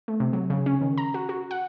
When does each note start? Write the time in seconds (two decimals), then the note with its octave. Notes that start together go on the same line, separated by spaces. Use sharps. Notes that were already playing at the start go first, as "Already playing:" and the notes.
0.08 A3
0.20 C3
0.33 F#3
0.50 C#3
0.66 C#4
0.81 D#3
0.98 A#5
1.14 F#4
1.29 F#4
1.51 F#5